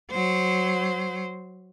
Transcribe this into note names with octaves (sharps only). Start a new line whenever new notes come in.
F#3 C5